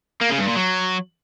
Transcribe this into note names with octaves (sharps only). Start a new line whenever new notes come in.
A#3
C#3
G2
A#2
F#3